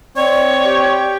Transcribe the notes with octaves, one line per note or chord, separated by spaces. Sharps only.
C4 C#5 D5
G4